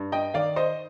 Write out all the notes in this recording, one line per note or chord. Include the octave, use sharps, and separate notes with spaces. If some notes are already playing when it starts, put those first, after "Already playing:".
Already playing: G2
D#5 G5
D#3 D5 F5
C5 D#5